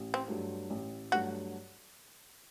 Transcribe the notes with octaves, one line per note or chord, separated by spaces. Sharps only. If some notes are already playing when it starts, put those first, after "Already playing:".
Already playing: A1
C4
G2 F#3 A3
A1
G2 F#3 A3 F#4